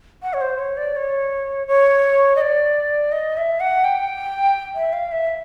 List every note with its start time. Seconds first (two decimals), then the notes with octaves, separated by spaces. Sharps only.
0.23 F#5
0.34 C#5
0.41 C5
0.59 C#5
0.77 D5
0.96 C#5
1.67 C#5
2.36 D#5
2.41 D5
3.12 D#5
3.37 E5
3.60 F#5
3.84 G5
4.75 E5
4.93 F5
5.12 E5